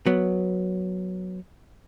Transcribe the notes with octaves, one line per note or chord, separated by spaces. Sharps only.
F#3 B3